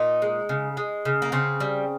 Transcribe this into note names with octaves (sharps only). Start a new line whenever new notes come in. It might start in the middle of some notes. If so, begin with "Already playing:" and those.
Already playing: A#2 D#4
G#3
C#3
G#3
C#3
A#3
C#3 C4
G3